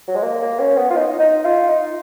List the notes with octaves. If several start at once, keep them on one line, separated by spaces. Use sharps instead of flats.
F#3
G#3
A#3
A#3
C#4
B3
F4
D#4
D#4
F4
D#4